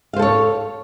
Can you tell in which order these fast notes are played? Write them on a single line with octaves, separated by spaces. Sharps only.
F5 C5 A4 C#5